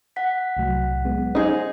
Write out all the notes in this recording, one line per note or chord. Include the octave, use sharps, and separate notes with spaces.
F#5 B6
C2 A2 F#3
G#3 B3
D#4 G#4 C5